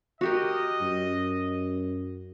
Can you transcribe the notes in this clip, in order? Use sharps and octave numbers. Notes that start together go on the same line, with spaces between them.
F#4 G4 A#4 D#5
F#2